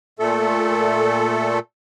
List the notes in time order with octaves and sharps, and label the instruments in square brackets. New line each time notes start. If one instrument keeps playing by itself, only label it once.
[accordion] A#2 A3 A4